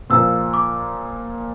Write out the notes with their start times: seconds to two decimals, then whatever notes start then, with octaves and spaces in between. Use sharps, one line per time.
0.10 A#2 F3 A#3 E6
0.54 D6